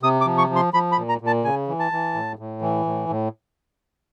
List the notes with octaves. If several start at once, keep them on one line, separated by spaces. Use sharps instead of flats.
C3 D#6
D6
F3
C#6
F3
C6
F3 B5
B5
A#2
A#5
A#2
A5
C#3 G#5
E3
A5
E3
A2
A2
E3
A2
A2